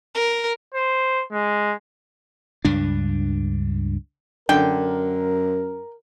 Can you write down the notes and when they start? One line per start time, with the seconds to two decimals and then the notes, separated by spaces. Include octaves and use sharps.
0.15 A#4
0.74 C5
1.32 G#3
2.65 C#2 G2 D4
4.49 F#2 D3 A#4 G5